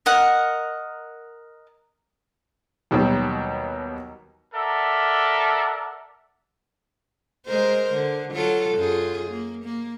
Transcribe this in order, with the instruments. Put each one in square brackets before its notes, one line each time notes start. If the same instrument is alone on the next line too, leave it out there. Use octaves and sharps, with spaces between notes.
[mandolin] A#4 D#5 F#5
[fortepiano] D#2 B2 D#3 F#3 G3
[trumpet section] A4 A#4 D5 E5 F#5
[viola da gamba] G#3 A#4 C5
D3
F#3 F4 A4
F#2 F4 G#4
A#3
A#3